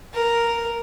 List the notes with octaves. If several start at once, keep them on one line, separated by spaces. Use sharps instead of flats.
A#4